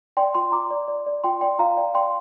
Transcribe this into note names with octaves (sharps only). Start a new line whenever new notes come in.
D5 G5 C6
F4 G5 C6
F4 A#5 D6
D5
D5
D5
F4 G5 C6
D5 G5 C6
F4 F5 A#5
D5 G5
D5 G5 C6